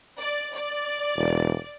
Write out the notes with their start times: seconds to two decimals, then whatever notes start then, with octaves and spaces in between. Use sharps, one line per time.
0.20 D5
0.55 D5
1.17 E1